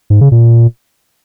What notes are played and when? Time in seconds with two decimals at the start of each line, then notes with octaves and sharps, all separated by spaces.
0.10 G#2
0.21 C#3
0.32 A#2